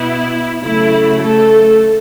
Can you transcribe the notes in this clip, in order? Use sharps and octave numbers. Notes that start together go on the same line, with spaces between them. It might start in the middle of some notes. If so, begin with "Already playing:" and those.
Already playing: B2 B3 E4
C#3 F#3 A3 E4
A3 A4